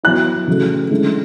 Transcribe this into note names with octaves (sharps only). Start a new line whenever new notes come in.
F#3 B3 E4 F#6
C#3 F#3 A3
D3 G#3 C#4 E4